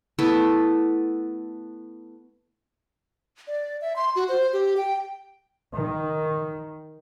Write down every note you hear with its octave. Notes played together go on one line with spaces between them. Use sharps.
A3 B3 E4 A4
D5
E5
C6
F#4
C5
G4
G5
D#3